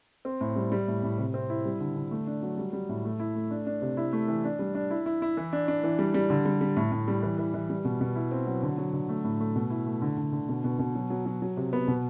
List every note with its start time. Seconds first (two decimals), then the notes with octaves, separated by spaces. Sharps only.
0.25 C4
0.41 A2
0.56 G3
0.72 G3
0.88 A2
1.03 A2
1.18 C3
1.34 C4
1.50 E4
1.65 G3
1.80 D3
1.96 D3
2.11 A3
2.27 D4
2.43 F#3
2.58 G3
2.73 G3
2.89 A2
3.04 A3
3.20 E4
3.35 A3
3.51 D4
3.66 D4
3.82 C3
3.97 E4
4.13 A3
4.28 E3
4.44 D4
4.59 G3
4.75 D4
4.91 E4
5.06 E4
5.22 E4
5.37 E3
5.53 D4
5.68 D4
5.83 E3
5.99 G3
6.14 G3
6.30 D3
6.46 G3
6.61 G3
6.76 A2
6.92 A2
7.08 G3
7.23 E3
7.38 E3
7.54 E3
7.70 G3
7.85 B2
8.01 B2
8.16 E4
8.32 C4
8.47 F#3
8.62 D3
8.78 F#3
8.93 D3
9.09 A3
9.24 A2
9.40 A3
9.55 B2
9.70 E4
9.86 A3
10.02 D3
10.17 D3
10.33 D3
10.49 B2
10.64 B2
10.79 B2
10.95 F#3
11.10 F#3
11.26 F#3
11.42 F#3
11.57 C3
11.73 B3
11.88 B2